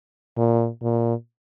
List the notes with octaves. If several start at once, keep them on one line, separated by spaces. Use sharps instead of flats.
A#2
A#2